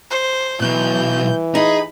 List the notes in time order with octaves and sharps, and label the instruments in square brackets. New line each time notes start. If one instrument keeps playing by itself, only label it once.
[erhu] C5
[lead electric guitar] B1 B2 [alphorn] E3 [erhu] G6
[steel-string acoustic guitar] D#4 [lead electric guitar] G#4 [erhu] B5